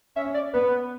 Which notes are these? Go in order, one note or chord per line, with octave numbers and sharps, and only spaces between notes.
C#4 E5
D5
B3 B4